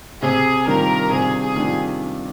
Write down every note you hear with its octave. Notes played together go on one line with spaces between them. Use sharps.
C3 G#4
D#3 G3 D4 F4 A#4
C3 G#4
G#4
D#3 G3 D4 F4